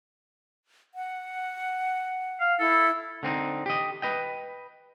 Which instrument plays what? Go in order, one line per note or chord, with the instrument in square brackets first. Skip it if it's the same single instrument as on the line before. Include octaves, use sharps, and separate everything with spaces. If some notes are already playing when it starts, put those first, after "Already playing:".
[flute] F#5
[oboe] F5
[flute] E4 [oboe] A4
[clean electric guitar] D3 C4 C#4 D#4
G4 D#5
B4 D#5 G5